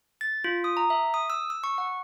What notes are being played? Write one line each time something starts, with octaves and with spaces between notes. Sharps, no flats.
A6
F4
D#6
A#5
E5
D#6
E6
E6
C#6
F#5